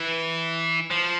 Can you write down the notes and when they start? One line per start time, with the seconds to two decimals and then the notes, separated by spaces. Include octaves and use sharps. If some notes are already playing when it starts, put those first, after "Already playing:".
Already playing: E3
0.91 F3